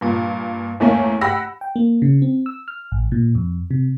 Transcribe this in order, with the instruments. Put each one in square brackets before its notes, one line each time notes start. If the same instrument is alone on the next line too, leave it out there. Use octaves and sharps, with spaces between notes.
[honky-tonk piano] G2 A#2
E2 A3 A#3 C#4
G4 F#5 B5 E6 A#6
[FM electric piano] G5
A#3
C#3
C4
E6
F6
A1
A#2
F2
C3